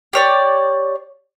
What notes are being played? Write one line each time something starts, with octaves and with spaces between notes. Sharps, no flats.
G4 C#5 D5